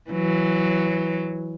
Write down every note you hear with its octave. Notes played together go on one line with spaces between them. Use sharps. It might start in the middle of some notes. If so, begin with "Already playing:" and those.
E3 F#3